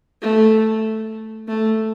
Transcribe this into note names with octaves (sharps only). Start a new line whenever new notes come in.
A3
A3